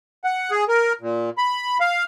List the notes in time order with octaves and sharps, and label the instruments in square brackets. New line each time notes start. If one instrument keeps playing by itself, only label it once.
[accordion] F#5
G#4
A#4
A#2
B5
F5